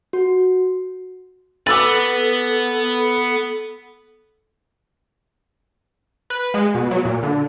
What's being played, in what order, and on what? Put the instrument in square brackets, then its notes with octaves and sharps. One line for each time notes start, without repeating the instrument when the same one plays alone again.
[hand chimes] F#4
[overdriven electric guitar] B3 B4 [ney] A4 [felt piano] D6 E6 A6
[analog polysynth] B4
G#3
B2
F#3
A#2
D3